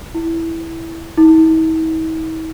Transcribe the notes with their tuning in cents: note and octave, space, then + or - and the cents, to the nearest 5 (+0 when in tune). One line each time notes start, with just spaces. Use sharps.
E4 +0
E4 -45